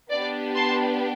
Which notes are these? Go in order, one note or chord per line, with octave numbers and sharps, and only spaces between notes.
B3 D4 G4 D5
A5 C6